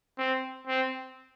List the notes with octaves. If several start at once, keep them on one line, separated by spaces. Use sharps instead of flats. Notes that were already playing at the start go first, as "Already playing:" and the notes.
C4
C4